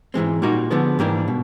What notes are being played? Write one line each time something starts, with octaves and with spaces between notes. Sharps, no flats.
G#2 E3 G#3 C4
A#2 G3 A#3 D#4 F#4
D3 F3 G#3 B3
G#2 E3 G3 A#3 D4
B2